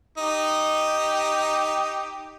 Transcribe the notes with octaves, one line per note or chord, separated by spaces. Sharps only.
D#4 G4